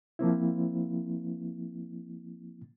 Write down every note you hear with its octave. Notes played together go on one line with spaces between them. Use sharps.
F3 A#3 C4 E4